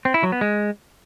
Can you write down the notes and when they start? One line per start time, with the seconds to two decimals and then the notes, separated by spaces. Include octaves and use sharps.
0.05 C4
0.14 E4
0.23 F#3
0.32 B3
0.41 G#3